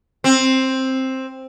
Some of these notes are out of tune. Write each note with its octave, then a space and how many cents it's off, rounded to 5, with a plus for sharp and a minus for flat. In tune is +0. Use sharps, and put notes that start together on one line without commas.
C4 +10